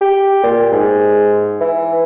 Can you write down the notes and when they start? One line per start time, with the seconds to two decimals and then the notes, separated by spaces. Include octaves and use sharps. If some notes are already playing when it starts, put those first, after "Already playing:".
0.01 G4
0.44 A#2
0.72 G#2
1.61 E3